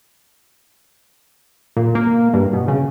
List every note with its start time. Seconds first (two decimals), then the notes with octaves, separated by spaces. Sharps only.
1.77 A#2
1.95 A#3
2.34 G2
2.53 B2
2.68 C#3